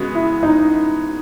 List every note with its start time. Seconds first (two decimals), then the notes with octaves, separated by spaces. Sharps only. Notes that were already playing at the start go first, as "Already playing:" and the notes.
Already playing: C#3 G#3 B3 F#4
0.15 E4
0.43 D#4